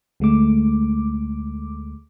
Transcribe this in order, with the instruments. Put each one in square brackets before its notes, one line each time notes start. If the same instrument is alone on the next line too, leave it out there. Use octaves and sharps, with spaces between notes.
[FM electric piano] D2 G#3 A3 D6